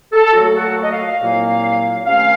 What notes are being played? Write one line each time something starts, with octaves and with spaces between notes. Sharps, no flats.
A4
A#2 F#3 A3 F#4
A4
F#4
D#5
F5
F5
C2 A#2 F#3 A#3
C3 D#3 A3 C#4 F5